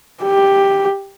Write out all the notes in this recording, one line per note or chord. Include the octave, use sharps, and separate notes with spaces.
G4